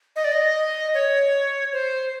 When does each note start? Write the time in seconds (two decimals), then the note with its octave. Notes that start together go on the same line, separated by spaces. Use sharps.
0.16 D#5
0.24 D5
0.32 D#5
0.94 C#5
1.73 C5